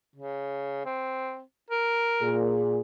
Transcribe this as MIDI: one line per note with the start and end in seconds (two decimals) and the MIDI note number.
0.16 0.85 49
0.86 1.42 60
1.70 2.43 70
2.21 2.80 46
2.21 2.80 68